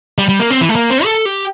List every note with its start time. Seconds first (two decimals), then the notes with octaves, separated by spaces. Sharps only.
0.18 G3
0.29 G3
0.40 A#3
0.50 C4
0.61 E3
0.69 A3
0.76 A#3
0.90 C4
1.04 A4
1.26 G4